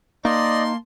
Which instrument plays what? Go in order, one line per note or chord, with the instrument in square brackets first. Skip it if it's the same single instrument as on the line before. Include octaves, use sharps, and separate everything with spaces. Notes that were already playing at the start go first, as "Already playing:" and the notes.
[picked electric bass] A#3 [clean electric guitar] D#4 [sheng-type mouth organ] D5 D#5 [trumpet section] A5 C6